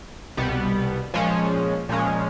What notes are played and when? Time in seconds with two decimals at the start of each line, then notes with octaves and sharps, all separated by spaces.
0.37 C2 B2 G3 B3
1.14 A#2 F3 G#3 C#4
1.89 A#2 F3 G#3 C#4